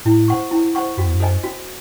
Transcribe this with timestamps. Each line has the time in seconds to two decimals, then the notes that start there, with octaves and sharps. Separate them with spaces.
0.05 A2 E4
0.28 C5 F#5 C#6
0.51 E4
0.75 C5 F#5 C#6
0.97 F#2 F#4
1.06 E2
1.14 F#2
1.20 A4 C5 D#5 G#5
1.44 F#4